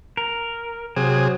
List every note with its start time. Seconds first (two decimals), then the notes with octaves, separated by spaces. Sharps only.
0.17 A#4
0.96 C3 F#3 G#4